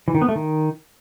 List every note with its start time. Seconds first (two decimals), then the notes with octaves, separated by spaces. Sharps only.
0.08 E3
0.15 D#3
0.22 B3
0.29 A3
0.36 D#3